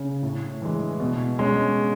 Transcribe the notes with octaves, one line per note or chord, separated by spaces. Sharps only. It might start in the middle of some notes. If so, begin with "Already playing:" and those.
Already playing: C#3
A2
E3 G#3
B2
G#3 C#4